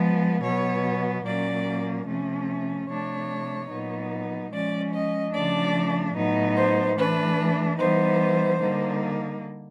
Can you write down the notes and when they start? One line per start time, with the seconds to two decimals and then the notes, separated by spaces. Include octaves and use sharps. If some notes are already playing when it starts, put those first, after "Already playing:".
Already playing: F3 G#3 B3
0.43 B2 F#3 B3 C#5
1.25 A#2 F#3 A#3 C#4 D5
2.07 C3 F3 A3 C#4
2.88 C3 F3 A3 D4 C#5
3.70 A#2 F#3 B3 D#4
4.52 F3 G#3 C#4 D5
4.93 D#5
5.33 C#3 F3 A3 D4 D5
6.15 A2 F#3 B3 D#4
6.56 C5
6.97 E3 A3 D4 B4
7.78 E3 G3 B3 D#4 C5
8.60 D3 G3 A#3 D#4